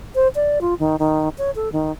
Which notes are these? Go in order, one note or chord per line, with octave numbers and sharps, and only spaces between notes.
C5
D5
F4
D#3
D#3
C#5
A4
D#3